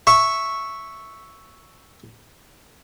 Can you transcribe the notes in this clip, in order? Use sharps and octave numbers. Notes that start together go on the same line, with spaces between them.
E5 C#6